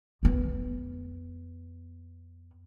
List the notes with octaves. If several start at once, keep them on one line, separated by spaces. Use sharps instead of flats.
F2 B3